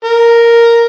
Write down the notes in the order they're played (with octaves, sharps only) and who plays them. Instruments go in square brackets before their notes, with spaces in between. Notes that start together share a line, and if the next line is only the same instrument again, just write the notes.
[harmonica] A#4